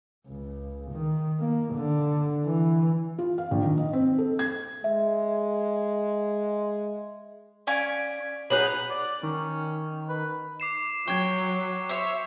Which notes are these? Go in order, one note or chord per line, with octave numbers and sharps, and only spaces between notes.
C#2
D#3
A#3
D3
E3
F4
F5
A#1
D#3
D#5
C4
A4
G#6
G#3 E5
C#4 D5 F5 G#5 D7
F#3 D#4 G#4 B4 F#6 F#7
D5
D#3 C#4
B4
D6 C7 E7
F#3 G5 C#6 G#6
C5 C#5 E5